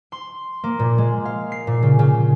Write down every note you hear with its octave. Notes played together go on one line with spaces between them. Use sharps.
C6
A#3
A#2
G#3
F5
C7
A#2
C#3
C#3